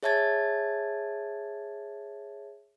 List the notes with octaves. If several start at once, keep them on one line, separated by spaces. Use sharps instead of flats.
G#4 C#5 E5 A5 G#6 A6